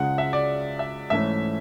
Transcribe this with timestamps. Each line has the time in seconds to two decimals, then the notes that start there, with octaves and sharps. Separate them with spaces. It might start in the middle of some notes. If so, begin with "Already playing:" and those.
Already playing: C#2 C#3 G#3 F#5
0.18 E5
0.33 D5
0.79 E5
1.10 G#2 E3 A3 C#4 E5